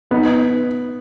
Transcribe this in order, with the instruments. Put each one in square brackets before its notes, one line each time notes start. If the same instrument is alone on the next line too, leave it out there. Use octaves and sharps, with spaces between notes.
[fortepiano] B3 [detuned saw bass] D#4